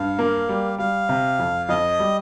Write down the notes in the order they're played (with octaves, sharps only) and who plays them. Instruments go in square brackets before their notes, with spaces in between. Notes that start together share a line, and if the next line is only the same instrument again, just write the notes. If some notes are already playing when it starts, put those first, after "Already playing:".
Already playing: [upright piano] G2 [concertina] F5
[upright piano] A#3
G3
[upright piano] G3 [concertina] F5
[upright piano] C3
F2
[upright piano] F2 [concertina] D#5
[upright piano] G3